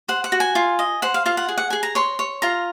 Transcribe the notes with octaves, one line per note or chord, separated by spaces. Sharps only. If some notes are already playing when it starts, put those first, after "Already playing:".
C5 F#5
F#5
F#4
G#5
F4
D#5
C5 F#5
F5
F4 F5
F#5
G#4
F#5
G#4 G#5
A#5
C#5 C6
C#5
F4 A#5